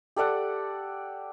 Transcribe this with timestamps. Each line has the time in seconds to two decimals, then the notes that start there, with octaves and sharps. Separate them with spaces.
0.16 G4 A4 D5 F#5